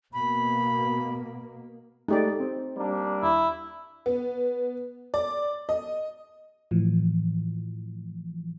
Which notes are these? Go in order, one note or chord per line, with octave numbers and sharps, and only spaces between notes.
B2 A#3 B5
G#3 A3 D#4 G4 A4 D5
C4 C5
G3 A#3 D4
D#2 E4
B3
D5
D#5
A2 E3 F3